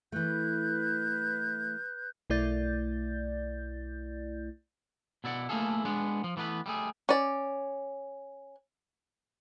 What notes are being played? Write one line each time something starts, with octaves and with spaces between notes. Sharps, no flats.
E3 A3 B4 F#6 G6
B1 A3 E4 D5 G6 A6
B2 E4 D5 F#5
A3 A#3 E4 F4 G#4 A4
G#3 B3 D4
F3
E3 A3 B3 A#4 B4
G3 A3 G#4
C#4 D5